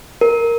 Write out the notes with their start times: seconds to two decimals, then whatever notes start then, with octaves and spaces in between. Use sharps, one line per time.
0.21 A#4